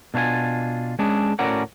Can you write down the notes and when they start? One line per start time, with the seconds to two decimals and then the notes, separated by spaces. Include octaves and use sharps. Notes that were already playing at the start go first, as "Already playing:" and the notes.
0.14 B2 D4 F4 C5 G#5
0.99 G#3 C#4 D4 G#4
1.39 A2 C#4 F#4 A#4 D5 F#5